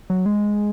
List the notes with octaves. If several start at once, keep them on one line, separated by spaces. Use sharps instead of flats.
F#3
G#3